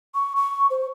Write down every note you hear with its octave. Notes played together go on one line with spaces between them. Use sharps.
C#6
C#6
C5